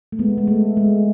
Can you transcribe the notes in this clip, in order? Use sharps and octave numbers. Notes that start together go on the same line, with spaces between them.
A3
G#3 B3
G#3
A3
G#3